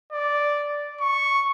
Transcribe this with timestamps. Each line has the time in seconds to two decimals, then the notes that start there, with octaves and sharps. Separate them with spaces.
0.12 D5
1.01 C#6